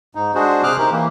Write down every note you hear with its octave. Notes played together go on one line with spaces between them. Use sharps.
G#2 D#4
G#3 D4 F#4 G#4 C5
C3 G#4 C5 D6 F6 F#6
D#4 G4 A#4 C5
E3 A#3